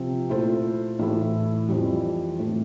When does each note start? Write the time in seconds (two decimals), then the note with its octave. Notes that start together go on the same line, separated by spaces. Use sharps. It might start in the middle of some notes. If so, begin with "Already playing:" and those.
Already playing: C3 F3 C4
0.29 A#2 A3 E4 A4 C5
0.99 A2 E3 A3 E4
1.69 F2 E3 G3
2.39 A2 E3 A3